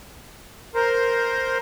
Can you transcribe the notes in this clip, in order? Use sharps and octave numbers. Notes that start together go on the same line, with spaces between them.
A#4 C5